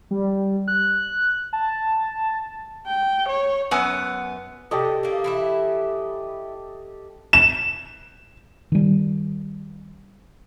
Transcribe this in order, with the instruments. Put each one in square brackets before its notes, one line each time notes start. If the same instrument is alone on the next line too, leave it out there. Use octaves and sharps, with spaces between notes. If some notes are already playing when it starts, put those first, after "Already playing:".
[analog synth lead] G3
F#6
A5
[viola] G5
C#5
[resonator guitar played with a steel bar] F#2 B3 G#5
[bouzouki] A2 C3 [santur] G4 A4 D#5
[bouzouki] A3 A#3
E3 E4 E5
[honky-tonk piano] E7
[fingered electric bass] D#3 G3